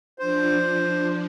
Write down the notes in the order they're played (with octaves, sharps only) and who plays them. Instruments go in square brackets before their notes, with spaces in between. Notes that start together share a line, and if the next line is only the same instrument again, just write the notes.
[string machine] F3 D4 [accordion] C5